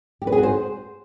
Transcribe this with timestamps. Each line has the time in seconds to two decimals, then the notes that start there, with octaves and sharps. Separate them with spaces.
0.22 G4
0.27 B4
0.32 G#4
0.38 F#4
0.43 C5